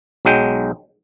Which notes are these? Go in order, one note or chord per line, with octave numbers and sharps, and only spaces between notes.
B1 F#3 G#3 G5